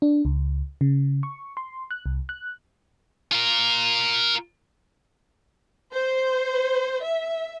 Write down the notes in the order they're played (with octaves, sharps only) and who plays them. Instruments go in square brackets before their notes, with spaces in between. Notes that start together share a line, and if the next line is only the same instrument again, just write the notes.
[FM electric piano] D4
C#2
C#3
C#6
C6
F#6
C2
F#6
[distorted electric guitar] F4 A#4
[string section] C5
E5